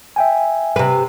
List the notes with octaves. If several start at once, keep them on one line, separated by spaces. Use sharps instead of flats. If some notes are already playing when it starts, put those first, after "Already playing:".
E5 G5 G#5
C3 B4